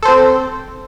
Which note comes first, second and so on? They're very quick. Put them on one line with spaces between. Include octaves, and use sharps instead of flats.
A4 C5 C4